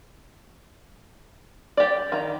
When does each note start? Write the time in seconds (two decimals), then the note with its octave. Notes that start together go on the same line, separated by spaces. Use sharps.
1.77 G4 D5
2.12 D#3 A#5